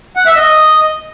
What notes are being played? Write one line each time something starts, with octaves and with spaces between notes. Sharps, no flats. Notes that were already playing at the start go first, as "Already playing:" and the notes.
F#5
E5
D#5